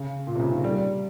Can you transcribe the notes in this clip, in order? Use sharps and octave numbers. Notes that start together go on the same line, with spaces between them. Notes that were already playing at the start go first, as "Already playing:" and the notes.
Already playing: C#3
A#2
C3
C#3
D#3
G3